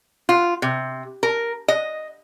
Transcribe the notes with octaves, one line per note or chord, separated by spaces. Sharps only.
F4
C3
A#4
D#5